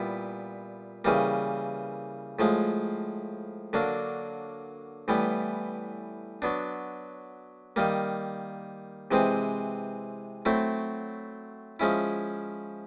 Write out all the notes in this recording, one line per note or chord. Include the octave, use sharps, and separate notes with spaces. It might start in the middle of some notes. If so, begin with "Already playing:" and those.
Already playing: A#2 G3 B3 E4
C#3 E3 G3 A#3
A2 F3 G#3
D3 F#3 A#3 D4
A2 E3 G3 B3
F#3 B3 D4
D#3 G3 A#3
C3 E3 G#3 C4
F#3 A3 C4 E4
F3 G#3 C#4 E4